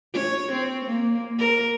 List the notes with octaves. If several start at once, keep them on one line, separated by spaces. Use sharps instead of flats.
C#5
C4
A#3
A#4